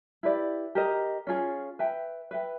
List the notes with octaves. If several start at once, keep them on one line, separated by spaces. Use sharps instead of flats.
E4 G4 B4 D5
G4 A#4 D#5
C#4 F4 G#4
B4 E5 G5
B4 E5 G5